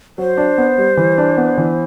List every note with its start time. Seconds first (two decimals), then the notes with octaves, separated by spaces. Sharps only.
0.18 F#3 C5
0.38 D4
0.58 B3
0.78 G3
0.97 E3
1.18 D4
1.37 B3
1.58 E3